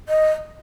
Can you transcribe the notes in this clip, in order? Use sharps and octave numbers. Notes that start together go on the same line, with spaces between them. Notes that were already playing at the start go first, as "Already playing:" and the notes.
D#5